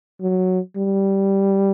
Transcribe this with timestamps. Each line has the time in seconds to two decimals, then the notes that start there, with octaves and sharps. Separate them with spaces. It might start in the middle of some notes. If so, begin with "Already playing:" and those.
0.21 F#3
0.77 G3